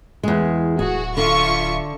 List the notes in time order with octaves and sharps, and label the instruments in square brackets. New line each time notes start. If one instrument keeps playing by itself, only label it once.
[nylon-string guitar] E2 G#3
[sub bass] D1 [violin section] F#4 [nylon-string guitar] G#4
[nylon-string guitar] D3 [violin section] F4 E5 C#6